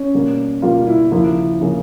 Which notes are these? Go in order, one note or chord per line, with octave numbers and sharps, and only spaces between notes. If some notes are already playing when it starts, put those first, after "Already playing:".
Already playing: C#4
B2 G3 A#3
B2 G3 A#3 F4
E4
D#2 C#3 F3 A#3 E4
C#3 F3 A#3